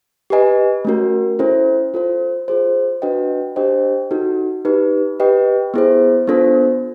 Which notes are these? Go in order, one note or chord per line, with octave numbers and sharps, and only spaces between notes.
G4 B4 D#5 G#5
A3 C#4 F#4 A#4
C#4 E4 A4 C5
F4 A4 C5
F4 G#4 C5
D4 F#4 B4 D#5 G5
D4 G4 C5 D#5 G5
D#4 F#4 A4
D#4 G4 B4
G4 B4 D#5 G5
B3 E4 G#4 C5
B3 D4 F4 A4 C5